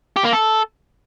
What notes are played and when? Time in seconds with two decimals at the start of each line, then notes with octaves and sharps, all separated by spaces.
0.16 G4
0.25 A#3
0.33 A4